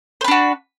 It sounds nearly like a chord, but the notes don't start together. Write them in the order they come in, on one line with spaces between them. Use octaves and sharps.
C5 B4 D4 F#4